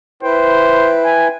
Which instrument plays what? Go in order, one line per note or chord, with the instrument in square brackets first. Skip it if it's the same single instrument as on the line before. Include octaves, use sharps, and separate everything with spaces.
[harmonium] E4 B4 G5 [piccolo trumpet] C5
[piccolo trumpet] G#5